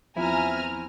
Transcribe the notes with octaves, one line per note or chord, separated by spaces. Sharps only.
E2 F3 C4 E4 G#5 A#5 F6